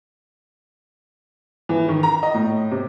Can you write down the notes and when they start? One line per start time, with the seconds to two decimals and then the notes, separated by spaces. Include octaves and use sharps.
1.69 E3
1.88 D#3
2.03 A#5
2.23 D#5
2.34 A2
2.71 C3